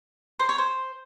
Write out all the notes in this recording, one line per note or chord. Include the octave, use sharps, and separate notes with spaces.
C5
C#5
C5